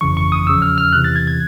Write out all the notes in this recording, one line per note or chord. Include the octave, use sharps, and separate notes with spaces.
G1 F2 C#3 E3 C#6
C#6
D#6
E2 C#3 F3 E6
F6
F6
E2 C3 E3 F#6
A6
G#6
G#6